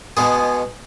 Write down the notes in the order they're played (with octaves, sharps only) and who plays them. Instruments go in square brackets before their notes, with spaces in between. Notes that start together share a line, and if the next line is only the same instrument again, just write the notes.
[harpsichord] B2 G#3 B3 G#4